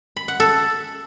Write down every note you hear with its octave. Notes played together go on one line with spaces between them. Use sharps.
B5
F#5
A4